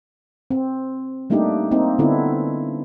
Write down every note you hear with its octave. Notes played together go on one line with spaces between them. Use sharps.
C4
G3 A3 A#3 D4 D#4 G4
A#3 C4 D#4
D3 B3 C4 D4 E4